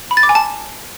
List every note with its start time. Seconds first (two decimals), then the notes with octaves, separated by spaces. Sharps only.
0.11 B5
0.17 A6
0.23 D6
0.29 G#5
0.35 A5